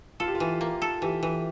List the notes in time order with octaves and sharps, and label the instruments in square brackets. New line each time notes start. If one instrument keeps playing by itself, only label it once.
[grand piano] F4 [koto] A4
[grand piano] G4
F4
[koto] E3
A#3
A4
[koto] E3 [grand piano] G4
[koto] E3